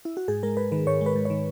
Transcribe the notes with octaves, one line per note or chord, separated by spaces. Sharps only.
E4
F#4
G#2 G#4
G#3 A#4
G#2 B4
D#3 B4
G#2 C#5
G#3 B4
G#2
D#3 C#5